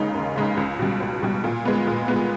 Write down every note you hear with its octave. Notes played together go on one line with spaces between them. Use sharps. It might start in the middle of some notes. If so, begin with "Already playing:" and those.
Already playing: D#2 C#3 G#3 D#4
D#2
C#3 G#3 D#4
C#2
B2 G3
C#2
B2 G3
A#2
G#3 B3
A#2
G#3 B3